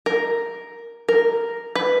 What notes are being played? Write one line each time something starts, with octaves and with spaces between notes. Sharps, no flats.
A#4
A#4
B4